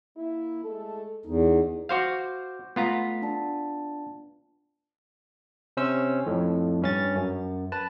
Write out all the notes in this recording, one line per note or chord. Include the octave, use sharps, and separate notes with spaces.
A#3 E4
G#3 A3 A4
E2 D#4
F#4 C5 F5 D6 G6
A3 B3 F4 A#5 B6
D4 A5
C3 C#4 C5 E6
F2 A2
G2 C#4 A6
F#2
B4 A5